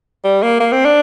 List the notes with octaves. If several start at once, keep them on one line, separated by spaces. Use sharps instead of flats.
G3
A#3
A#3
C4
D4